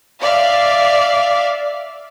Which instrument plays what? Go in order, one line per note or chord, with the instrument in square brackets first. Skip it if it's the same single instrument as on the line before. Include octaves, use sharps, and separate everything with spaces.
[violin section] D5 E5 F5